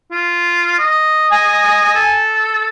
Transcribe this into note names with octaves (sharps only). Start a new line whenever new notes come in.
F4
D#5
G#5
A4